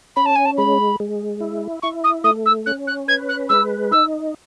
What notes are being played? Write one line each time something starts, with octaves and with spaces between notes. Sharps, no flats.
C#4 B5
A5
G#5
A5
G#3 B5
G#3
E4
E4 C#6
D#6
A3 D#6
E6
C#4 F#6
F#6
B4 G#6
F#6
G#3 E6
D#4 E6